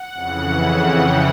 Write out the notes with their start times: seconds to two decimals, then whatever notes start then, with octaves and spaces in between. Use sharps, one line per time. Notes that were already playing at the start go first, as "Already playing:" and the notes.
Already playing: F#5
0.13 F2 C#3 E3
0.86 G5